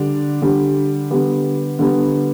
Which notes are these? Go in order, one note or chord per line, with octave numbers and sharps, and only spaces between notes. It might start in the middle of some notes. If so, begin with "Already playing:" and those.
Already playing: D3 G3 D4
D3 G3 D4
D3 G3 B3
D3 G3 B3